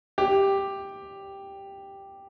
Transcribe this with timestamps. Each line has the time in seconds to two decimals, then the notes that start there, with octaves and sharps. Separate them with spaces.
0.18 G4